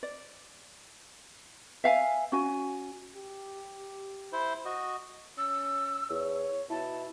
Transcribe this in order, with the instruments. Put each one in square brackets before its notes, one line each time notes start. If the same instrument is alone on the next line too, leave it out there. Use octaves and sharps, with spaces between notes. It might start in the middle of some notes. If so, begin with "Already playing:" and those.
[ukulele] D5
E5 F5 G5 G#5
C#4 F#4 G#5
[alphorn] G4
[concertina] E4 C5
F#4 D#5
[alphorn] C#4 [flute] E6
[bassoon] E2 [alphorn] C#5
[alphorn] B2 [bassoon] E4 [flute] A5